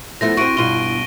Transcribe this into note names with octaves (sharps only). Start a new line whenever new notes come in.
F3 A3 B3 E4 A#6
C4 F#4 C#6 D7 D#7
G2 B2 F4 D#7 G7